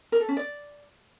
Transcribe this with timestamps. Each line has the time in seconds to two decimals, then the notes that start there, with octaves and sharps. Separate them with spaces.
0.12 A#4
0.20 A4
0.29 C#4
0.37 D5